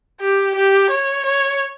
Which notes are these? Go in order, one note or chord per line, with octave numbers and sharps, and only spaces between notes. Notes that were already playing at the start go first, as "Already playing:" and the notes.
G4
G4
C#5
C#5